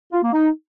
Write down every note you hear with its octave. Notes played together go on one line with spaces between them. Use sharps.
F4
A#3
D#4